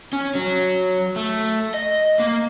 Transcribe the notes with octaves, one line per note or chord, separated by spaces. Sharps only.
C#4
F#3
A3
D#5
A#3